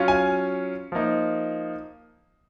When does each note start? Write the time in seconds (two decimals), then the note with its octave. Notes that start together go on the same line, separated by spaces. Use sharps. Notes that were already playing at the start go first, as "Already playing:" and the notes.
Already playing: F#3 C#4 F4
0.08 G#5
0.92 F3 A#3 D#4